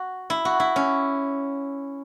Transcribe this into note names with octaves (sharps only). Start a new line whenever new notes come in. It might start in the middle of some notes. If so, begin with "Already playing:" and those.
Already playing: F#4
E4
F#4
E4
C#4